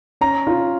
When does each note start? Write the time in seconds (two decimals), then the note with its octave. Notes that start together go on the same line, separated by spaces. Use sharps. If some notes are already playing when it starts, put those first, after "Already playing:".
0.21 C#4 A#5
0.47 F4